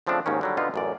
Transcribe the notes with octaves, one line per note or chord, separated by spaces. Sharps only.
C#3 F3 A3 C4 D4
D#2 G#2 D#3 C#4
D3 F#3 G3
B2 D3 B3 D#4 F4
A1 F#2 D5